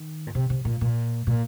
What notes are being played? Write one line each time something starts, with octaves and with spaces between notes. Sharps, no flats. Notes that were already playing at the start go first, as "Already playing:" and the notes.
Already playing: D#3
A#2
C3
C3
A#2
A#2
A#2